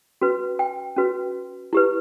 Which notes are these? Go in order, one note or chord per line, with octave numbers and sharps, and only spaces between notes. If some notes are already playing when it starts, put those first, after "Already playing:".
C#4 F#4 B4
G5
C#4 F#4 B4
E4 G4 B4